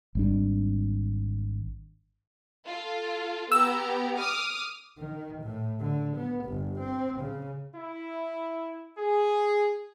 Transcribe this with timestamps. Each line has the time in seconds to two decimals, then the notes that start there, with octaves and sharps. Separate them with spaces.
0.15 G#1 G3 D4
2.66 F4 A4
3.52 B3 G4 A#5 E6
4.18 D6 D#6 F6
4.98 D#3
5.42 A2
5.80 D3
6.17 B3
6.45 G1
6.79 C4
7.20 C#3
7.75 E4
8.98 G#4